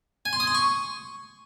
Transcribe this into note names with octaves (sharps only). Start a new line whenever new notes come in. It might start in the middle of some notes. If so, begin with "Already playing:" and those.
G#5
C6
D#6
C6
C#6